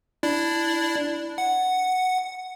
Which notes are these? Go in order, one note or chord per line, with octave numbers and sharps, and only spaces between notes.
D4 E4 D5
F#5